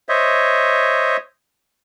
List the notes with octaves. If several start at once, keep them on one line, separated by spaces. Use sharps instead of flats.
C5 C#5 D#5 E5